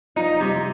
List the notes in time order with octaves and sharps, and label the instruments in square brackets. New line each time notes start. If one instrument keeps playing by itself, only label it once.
[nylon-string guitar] F3 F4 [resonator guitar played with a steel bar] D#4
[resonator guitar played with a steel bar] C3 [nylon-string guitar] G3 G4